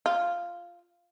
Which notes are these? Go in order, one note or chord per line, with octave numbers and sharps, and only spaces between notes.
F4